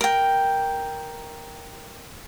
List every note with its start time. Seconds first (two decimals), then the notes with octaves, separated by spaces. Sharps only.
0.01 A#4 G5